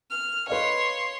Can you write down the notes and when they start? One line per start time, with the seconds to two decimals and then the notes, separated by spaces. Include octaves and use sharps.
0.10 F6
0.48 B4 C#5 D#5 F5 C6